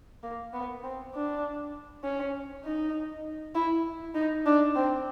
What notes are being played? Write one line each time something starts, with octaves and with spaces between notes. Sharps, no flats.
A#3
B3
C4
D4
C#4
D#4
E4
D#4
D4
C4